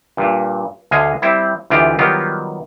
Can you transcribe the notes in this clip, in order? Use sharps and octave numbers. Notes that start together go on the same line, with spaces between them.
G2 A#2
D2 D3 D#5 F5 G#5
G3 C4 E4
D2 E3 F4 G4 D5 D#5
D#3 F#3 G3 B3 F4 G4